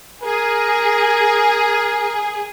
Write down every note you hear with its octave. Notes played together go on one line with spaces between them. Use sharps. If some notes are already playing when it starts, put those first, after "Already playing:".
G#4 A#4